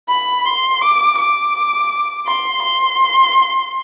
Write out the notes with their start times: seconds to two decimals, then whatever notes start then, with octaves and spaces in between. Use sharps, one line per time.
0.09 B5
0.46 C6
0.81 D6
1.18 D6
2.27 C6
2.63 C6